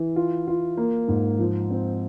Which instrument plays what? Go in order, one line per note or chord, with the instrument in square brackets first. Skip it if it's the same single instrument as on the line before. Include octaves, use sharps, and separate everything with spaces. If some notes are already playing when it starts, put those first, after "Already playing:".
Already playing: [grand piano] E3 E4
F4
F4
A#3
G#2
F3
C4